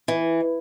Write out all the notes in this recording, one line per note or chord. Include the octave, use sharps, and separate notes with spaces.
E3